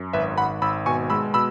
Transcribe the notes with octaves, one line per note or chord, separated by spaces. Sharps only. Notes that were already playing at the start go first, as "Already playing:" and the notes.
Already playing: F#2
G#1 B4 E5
G#1 F#5 B5
G#1 B5 E6
B2 G#5 C#6
G#3 B5 E6
B2 B5 E6